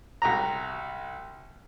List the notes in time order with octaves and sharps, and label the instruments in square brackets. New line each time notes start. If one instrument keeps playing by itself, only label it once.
[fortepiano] C2 F#4 A#5